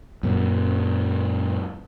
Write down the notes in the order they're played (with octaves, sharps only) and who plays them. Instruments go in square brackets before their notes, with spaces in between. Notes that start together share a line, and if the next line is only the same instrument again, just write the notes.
[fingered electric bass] F#2 A#2 F#3